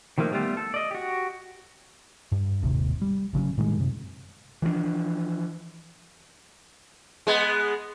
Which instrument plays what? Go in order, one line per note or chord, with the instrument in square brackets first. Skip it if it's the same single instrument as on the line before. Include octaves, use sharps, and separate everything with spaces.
[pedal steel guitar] D#3 F3 A3 A#3 D#4
G3 A3 B3 F4 G4
A4
D5 D#5
F#4 G4
[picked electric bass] G2
D#1 G#1 D#2 C3
G3
G#1 C#3 F#3 C#4
A2 D#3 G3 G#3
F#2 C3
[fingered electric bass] E3 F3 G#3 D4
[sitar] G#3 B3